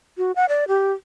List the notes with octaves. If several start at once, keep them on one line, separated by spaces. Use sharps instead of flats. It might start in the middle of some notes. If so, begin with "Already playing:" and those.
F#4
F#5
D5
G4